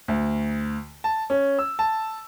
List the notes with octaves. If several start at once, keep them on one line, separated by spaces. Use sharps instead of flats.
D2
A5
C#4
E6
A5